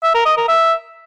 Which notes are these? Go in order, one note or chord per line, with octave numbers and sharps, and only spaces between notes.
E5
A#4
D#5
A#4
E5